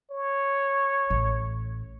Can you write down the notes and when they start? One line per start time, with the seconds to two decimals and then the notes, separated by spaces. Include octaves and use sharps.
0.11 C#5
1.10 A1